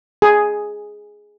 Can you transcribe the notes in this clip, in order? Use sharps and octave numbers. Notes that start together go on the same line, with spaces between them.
G#4